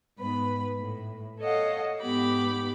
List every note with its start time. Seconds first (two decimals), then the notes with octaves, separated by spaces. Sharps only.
0.19 G#2 B3 B4 B5
0.79 A2
1.40 A4 C#5 D#5 F5 F#5
2.00 G#2 B3 G4 B5 D6